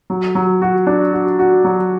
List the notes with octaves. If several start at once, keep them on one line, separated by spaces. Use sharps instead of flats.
F#3
F#3
F#4
D4
F#4
F#4
F#3